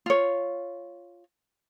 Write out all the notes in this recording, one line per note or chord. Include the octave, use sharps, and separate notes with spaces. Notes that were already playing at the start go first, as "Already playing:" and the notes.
F4 C#5